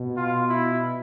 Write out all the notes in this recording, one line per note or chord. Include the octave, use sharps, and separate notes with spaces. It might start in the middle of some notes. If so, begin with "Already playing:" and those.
Already playing: B2
F4
E4